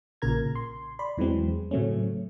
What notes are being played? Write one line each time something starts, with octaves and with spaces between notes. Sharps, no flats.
A#1 A#2 C#3 A#4 A#5 G#6
C6
D5 B5 C6
E2 E3 F#3 G#3 C4
A2 C#3 F#3 A3 C4 C#4